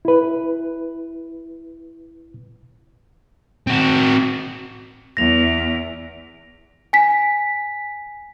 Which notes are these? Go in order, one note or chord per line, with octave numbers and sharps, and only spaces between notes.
E4 B4
C4 F#4
E2 A#6 F7
G#5 B6